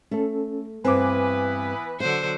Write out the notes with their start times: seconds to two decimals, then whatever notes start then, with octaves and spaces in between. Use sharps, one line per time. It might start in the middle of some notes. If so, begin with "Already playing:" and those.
0.11 A3 C#4 A4
0.85 G2 E3 B3 C4 B4 G#5 D6
2.00 D3 F#3 C5 F#5